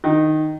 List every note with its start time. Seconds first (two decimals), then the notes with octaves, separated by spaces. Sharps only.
0.04 D#3